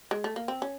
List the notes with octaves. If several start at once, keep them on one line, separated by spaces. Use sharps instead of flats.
G#3
A3
A#3
C4
C#4